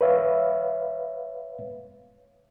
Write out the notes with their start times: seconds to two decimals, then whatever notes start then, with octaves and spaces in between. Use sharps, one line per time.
0.01 B4 C#5 E5 F5